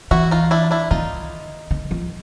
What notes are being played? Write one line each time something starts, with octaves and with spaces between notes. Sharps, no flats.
E3 E4 F#4
D#4 F4
D4 E4
D4 E4
D#3 D#4 F4
D#3
F3